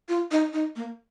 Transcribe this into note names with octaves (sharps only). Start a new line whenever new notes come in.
F4
D#4
D#4
A#3